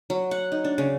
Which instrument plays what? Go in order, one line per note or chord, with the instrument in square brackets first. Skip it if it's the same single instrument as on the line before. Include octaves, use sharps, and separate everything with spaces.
[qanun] F#3
F#5
D#4
D4
C#3